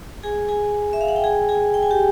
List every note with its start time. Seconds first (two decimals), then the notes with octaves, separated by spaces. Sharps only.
0.23 G#4 G#5
0.48 G#4 G#5
0.93 E5
1.01 F5
1.08 F#5
1.16 G5
1.24 G#4 G#5
1.49 G#4 G#5
1.74 G5
1.83 G#5
1.91 G4 G5